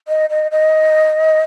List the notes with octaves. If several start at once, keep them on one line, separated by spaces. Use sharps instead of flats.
D#5
D#5
D#5